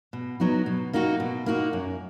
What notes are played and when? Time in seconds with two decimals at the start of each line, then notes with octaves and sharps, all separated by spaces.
0.13 B2
0.40 F#3 B3 D#4 F#4
0.66 B2
0.93 A#3 D#4 F#4
1.20 B2
1.46 A#3 D#4 F#4
1.73 F#2